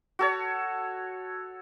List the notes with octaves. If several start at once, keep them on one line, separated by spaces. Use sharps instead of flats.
F#4 A4 C#5